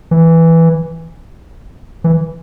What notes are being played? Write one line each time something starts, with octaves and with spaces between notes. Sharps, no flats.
E3
E3